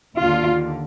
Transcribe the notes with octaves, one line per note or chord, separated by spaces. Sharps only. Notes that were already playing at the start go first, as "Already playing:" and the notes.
D#2 D3 F4